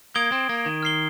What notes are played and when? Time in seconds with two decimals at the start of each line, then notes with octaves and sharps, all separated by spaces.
0.15 A#3 D#6 G#6 D7 G7
0.32 C4
0.49 A#3
0.66 D#3
0.83 F6 C7 G7